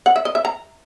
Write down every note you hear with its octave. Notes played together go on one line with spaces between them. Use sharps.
F#5
E5
D#5
E5
A#5